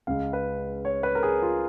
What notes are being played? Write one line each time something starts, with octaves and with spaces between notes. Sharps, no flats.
C#2 C#3 G#3 F5
B4
C#5
B4
A#4
G#4
F4